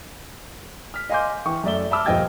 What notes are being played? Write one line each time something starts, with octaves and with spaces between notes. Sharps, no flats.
F6 B6
D#5 F5 G#5 C6 D6 G6
E3 G5 C#6
F#2 A3 D5 E5 G7
E5 A5 B5 D6 E6 F6
D#1 F3 D#5 G5 G#6 A6